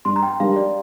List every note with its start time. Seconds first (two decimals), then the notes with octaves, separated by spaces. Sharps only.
0.05 G2 C6
0.16 A#5
0.23 G5
0.40 G3 D4 G4 A#4 F5
0.56 D5